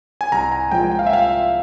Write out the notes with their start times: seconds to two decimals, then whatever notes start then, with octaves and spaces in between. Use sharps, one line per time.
0.21 G#5
0.32 C2 A#5
0.52 G#5
0.72 A#2 F3 G#3 G5
0.92 G5
0.99 F5
1.07 E5
1.12 C2 F5